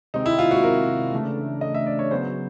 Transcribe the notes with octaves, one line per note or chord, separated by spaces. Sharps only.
C3 D#3 G#3 C4 D#4
E4
F4
F#4
A#4
C#3 E3 A3 D4
D#5
E5
D5
C#5
C#3 F#3 B3 C5